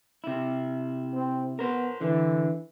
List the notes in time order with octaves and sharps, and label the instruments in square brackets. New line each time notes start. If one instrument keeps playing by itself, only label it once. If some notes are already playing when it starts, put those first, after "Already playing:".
[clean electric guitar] C3 E4
[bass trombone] C4
[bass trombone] B3 [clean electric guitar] A#4 C5
[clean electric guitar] D3 [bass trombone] E3